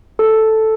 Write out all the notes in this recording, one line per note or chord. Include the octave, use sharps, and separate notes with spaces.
A4